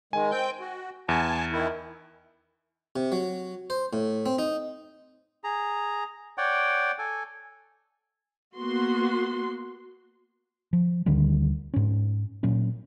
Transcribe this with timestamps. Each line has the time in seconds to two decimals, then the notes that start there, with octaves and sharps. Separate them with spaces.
0.13 D#3 G#3 G#5
0.31 C4 G5 G6
0.60 F#4
1.09 E2 G#5 A5
1.52 D#3 E4
2.96 C3
3.12 F#3
3.70 C5
3.93 A2
4.26 C4
4.38 D#4
5.44 G#4 A#5
6.38 C#5 D5 F#5 G5
6.99 A4 G#5
8.57 A#3 B3 F#4 C6
10.73 F3
11.06 D2 D3 D#3 G3
11.74 G#2 C#4
12.43 A#2 F#3 A#3 C#4